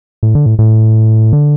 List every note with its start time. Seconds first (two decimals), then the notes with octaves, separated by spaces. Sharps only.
0.23 A2
0.35 D3
0.46 A2
0.59 A2
1.33 D3